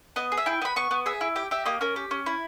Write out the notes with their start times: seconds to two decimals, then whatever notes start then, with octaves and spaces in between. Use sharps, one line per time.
0.16 B3 D#5
0.32 G#4
0.37 E5
0.46 E4 G5
0.62 B3 B5
0.76 B3 C#6
0.91 B3
1.06 G#4 E5
1.21 E4
1.36 G4 G5
1.51 G4 E5
1.65 A#3 D#5
1.81 C#4 A#4
1.96 G4
2.11 C#4
2.26 E4